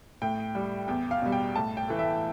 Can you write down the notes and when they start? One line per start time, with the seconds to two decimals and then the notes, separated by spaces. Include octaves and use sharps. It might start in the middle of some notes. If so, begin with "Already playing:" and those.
0.22 A2 G5
0.55 G3
0.88 E2 G5
1.11 F5
1.22 B2 G3
1.32 G5
1.55 A2 A5
1.77 G5
1.88 E3 A3
1.99 E5